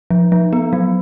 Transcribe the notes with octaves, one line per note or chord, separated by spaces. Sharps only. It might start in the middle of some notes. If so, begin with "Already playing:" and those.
F3
F3
B3
F#3